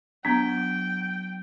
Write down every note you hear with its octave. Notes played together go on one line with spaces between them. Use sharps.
F#3 B3 D4 F#4 G5